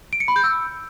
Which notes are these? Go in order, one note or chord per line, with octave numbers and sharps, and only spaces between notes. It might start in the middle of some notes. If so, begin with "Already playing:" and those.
D7
C#7
B5
G6
E6